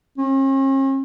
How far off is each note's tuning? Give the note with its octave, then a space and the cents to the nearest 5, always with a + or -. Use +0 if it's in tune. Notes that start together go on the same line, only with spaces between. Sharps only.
C#4 -45